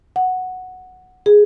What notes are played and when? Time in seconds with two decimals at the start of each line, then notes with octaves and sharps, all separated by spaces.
0.16 F#5
1.26 G#4